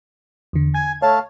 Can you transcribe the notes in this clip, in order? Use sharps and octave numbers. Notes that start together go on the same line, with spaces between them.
E2 D3
G#5 G#6
A3 C#5 F5 A5